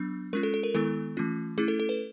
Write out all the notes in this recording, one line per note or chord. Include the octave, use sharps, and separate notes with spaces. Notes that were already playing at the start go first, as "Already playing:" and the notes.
Already playing: F#3 B3 D4
G#3 C#4 F4 A#4
A4
A4
A#4
D#3 G#3 B3 E4 A4
E3 A3 C#4 F4
A3 C#4 E4 G#4
A4
A4
B4